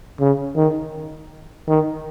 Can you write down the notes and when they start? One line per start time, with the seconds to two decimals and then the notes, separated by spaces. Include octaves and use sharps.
0.20 C#3
0.56 D#3
1.68 D#3